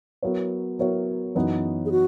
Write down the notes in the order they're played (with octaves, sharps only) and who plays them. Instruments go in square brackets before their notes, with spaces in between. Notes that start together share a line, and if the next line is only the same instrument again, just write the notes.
[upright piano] F#3 B3 E4 A#4 C#5
F#3 B3 E4 A#4 C#5
F#2 E3 B3 D#4
[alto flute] G#4
F#4